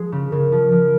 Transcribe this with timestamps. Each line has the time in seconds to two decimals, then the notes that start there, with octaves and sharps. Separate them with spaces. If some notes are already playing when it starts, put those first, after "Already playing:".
Already playing: F3 G#3 G#4
0.12 C#3
0.32 C#3 A#4
0.52 F3
0.72 F3